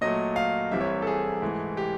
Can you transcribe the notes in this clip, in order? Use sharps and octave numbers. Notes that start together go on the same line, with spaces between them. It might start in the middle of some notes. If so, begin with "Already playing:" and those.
A#2 F#3 A3 D#5
F5
C2 C3 E3 G3 E5
C#5
A4
G#4
G#2 E3 A3
G4